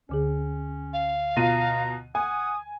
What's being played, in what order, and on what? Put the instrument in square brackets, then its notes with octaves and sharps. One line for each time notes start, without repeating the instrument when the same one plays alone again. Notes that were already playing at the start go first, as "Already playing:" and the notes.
[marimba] D2 D3 G#4 [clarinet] C#4
[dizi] F5
[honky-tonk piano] B2 F4 D#7 [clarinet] A#5
[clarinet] F#5 [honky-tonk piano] G#5 [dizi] D#6